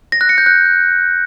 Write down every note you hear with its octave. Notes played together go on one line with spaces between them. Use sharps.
A#6
F#6
C#7
G6
F#6